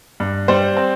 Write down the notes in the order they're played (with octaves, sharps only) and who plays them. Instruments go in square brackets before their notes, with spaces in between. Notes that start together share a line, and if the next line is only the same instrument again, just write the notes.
[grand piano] G2
[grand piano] G3 [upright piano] C5
[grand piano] C4